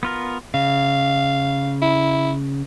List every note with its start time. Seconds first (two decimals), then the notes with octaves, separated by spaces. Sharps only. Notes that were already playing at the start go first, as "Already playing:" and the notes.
0.03 B3 F4 A#4
0.54 C#3 F5
1.82 E4